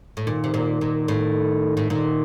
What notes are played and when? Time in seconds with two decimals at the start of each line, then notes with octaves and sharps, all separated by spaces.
0.17 A2
0.27 A#2 D#3
0.44 C3
0.54 A#2
0.81 A#2
1.08 A2
1.77 A2
1.90 A#2 D#3